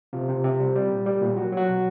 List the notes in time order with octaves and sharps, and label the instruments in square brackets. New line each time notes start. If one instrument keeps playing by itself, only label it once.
[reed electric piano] C3 F4
C3
C3
G3
G3
A#2
G3
A#2
F#3 F#4
F#3
F#4
B2